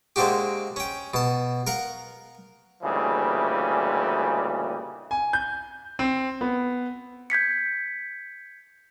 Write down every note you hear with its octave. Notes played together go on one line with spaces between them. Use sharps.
G#3 A#3 C4 D4 F#4 G4
C#4 G5
B2 A5
A#4 F5 F#5
D2 A#2 C#3 E3 G3 G#3
G#5
G6
C4
B3
G6 G#6 B6 C#7